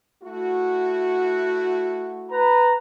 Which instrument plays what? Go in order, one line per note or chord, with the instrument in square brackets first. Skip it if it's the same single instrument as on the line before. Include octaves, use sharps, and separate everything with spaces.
[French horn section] A3 E4 F#4
[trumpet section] B4 A#5